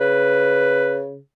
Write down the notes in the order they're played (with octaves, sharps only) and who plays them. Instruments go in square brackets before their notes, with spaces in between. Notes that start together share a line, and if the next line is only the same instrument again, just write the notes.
[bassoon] C#3 [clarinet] B4